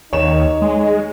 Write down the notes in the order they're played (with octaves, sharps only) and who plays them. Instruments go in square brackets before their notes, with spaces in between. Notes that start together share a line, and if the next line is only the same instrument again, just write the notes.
[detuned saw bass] D#2 [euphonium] D#4 [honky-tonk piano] C#5 E7
[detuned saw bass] G#3